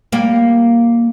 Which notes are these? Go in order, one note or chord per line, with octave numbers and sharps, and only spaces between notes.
G3 A#3